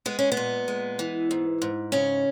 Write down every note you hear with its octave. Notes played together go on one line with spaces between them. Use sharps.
G#3 B3
C#4
B3
A#2
G#3
E3
G#2
G#2
C#3 C#4